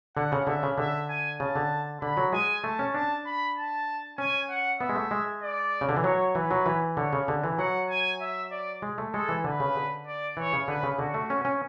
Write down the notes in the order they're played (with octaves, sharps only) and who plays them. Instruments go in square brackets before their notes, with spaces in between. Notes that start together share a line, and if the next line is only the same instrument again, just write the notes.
[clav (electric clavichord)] D3 [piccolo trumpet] F#5
[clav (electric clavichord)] C#3
[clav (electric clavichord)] D3 [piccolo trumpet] E5
[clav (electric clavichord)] C#3
[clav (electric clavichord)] D3 [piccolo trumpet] E5
[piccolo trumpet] G#5
[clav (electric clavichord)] C#3 [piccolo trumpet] A5
[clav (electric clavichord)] D3
[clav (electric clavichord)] D3 [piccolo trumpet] B5
[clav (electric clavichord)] F#3
[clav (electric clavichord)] G#3 [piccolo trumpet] G#5
[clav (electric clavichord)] A3 [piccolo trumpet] A5
[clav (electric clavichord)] C#4
[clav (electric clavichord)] D4 [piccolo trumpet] A5
[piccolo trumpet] B5
A5
[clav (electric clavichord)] C#4 [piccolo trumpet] G#5
[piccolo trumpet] F#5
[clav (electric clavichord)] B3 [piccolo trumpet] E5
[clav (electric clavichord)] G#3
A3
G#3
[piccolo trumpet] D5
[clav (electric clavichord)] C#3
D3
E3
[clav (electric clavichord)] F#3 [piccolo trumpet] C#5
[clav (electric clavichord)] E3 [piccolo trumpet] B4
[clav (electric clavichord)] F#3
E3
[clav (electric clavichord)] D3 [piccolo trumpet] C#5
[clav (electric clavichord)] C#3
D3
E3
[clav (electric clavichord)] F#3 [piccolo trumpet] F#5
[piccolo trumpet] G#5
E5
D5
[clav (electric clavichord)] G#3
A3
[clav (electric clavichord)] G#3 [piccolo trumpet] A4
[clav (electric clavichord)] E3
[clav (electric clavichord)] D3 [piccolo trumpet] B4
[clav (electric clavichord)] C#3
D3
[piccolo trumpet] D5
[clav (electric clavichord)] E3 [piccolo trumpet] C#5
[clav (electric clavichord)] C#3
[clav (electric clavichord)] D3 [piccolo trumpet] B4
[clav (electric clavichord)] C#3
[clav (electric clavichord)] D3 [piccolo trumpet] F#4
[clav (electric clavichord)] A3
C#4
C#4